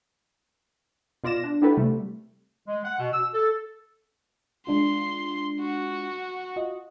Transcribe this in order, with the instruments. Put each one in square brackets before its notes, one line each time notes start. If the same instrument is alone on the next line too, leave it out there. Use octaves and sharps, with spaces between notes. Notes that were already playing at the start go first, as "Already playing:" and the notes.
[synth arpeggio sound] B2 F4 D5 A#6 E7
D4
D4 E4 F#4 G4 A4 B4
C3 G3 A3
[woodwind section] G#3
F#5
B2
E6
A4
[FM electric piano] G#3 D4 F4 [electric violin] C6
[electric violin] F#4
[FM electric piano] F4 F#4 D#5